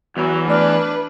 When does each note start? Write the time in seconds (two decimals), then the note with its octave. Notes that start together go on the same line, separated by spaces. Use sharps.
0.17 E2 E3 F#3 E4
0.48 A3 D4 B4 D5 F6